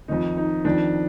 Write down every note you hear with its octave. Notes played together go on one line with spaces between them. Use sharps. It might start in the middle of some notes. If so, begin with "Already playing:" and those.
F2 D#3 D#4
D#4
F2 D#3 D4